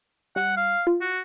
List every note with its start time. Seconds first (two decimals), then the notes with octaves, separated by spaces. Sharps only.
0.36 G3 F#5
0.57 F5
0.87 F4
1.01 F#4